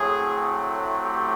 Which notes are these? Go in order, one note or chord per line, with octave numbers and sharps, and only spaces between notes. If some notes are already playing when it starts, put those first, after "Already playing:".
Already playing: A2 F#3 A3 C4 G#4
G4